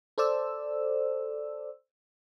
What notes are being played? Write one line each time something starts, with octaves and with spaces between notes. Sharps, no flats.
A4 C5 D5 E6